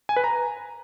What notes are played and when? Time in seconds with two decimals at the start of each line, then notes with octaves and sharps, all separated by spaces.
0.09 G#5
0.16 B4
0.24 A#5